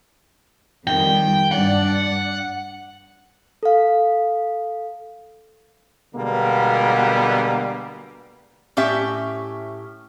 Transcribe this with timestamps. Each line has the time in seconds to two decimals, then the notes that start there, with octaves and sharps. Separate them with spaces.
0.87 F2 D#3 G3 G5
1.51 G2 D4 D5 F#5
3.63 A4 F5
6.15 B2 D3 G3 G#3 A#3 B3
8.77 A2 C#4 G4 E5